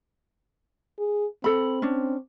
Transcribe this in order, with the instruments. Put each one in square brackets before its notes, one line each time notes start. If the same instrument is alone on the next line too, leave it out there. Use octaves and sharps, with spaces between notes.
[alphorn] G#4
[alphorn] C4 [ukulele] A4 B5
[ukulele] C#4 D4